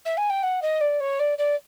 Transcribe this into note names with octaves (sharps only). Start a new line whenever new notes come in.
E5
G#5
G5
F#5
D#5
D5
C#5
D5
D5